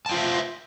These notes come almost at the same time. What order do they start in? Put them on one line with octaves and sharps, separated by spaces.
A5 G5 F4 C5 E5